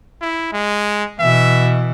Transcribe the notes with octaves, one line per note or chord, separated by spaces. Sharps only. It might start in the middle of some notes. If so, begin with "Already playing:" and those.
E4
G#3
B2 E3 E5